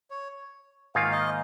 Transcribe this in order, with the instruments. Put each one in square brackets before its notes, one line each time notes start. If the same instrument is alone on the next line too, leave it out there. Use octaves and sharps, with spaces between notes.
[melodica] C#5
[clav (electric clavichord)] G#2 D#3 A#3 F4 [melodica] F5
[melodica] D#5